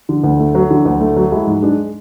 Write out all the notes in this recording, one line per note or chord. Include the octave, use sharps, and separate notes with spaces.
D3
D2
A3
F#3
D3
D2
A3
F#3
G#3 E4
G#2
G#3 D4